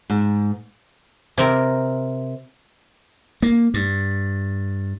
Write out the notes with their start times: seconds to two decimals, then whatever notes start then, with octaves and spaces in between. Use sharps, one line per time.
0.10 G#2
1.37 C3 C4 A#4
3.42 A#3
3.74 G2